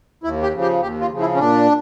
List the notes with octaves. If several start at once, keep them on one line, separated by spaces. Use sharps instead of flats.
D#2 E4
G4
C#3 F3
G4
D#2 G4
F4
C#3 F3
E4
C#4
A#2 D4